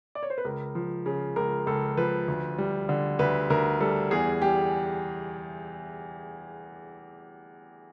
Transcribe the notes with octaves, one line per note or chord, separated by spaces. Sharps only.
D5
C#5
C5
B4
C#2 A#4
F3
C#3
C#2 A#4
C#2 A4
F3 B4
D2
G3
D3
D2 B4
D2 A#4
G3 A4
E2 G#4
G3 G4